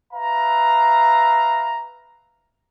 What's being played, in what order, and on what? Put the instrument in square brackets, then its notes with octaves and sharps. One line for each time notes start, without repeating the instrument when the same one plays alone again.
[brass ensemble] B4 E5 F5 A#5